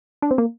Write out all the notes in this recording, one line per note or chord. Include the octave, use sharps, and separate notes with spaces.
D4
C4
A#3